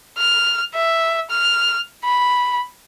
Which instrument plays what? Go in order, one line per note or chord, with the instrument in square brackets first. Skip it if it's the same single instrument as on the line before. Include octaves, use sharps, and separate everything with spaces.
[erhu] F6
E5
F6
B5